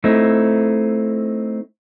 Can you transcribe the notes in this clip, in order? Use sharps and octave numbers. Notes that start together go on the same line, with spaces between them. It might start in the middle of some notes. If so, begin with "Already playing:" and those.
A3 C4 D#4 E4